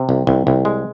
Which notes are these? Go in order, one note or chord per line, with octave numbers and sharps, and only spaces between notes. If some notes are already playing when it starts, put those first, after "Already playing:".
Already playing: C3
C2
C2
C2
G#3